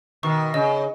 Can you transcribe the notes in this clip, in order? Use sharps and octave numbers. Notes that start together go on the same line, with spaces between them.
B2 D#3 C#6
C#3 D#5